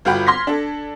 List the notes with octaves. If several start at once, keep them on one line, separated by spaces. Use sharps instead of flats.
G1 F4 F#4 G5 B5
C6 F6 G#6 A#6 B6
D4 A4